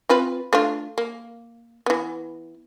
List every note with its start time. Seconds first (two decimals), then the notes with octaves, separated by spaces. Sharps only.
0.09 C4 F4 B4
0.53 A3 D4 F4
0.98 A#3
1.86 E3 B3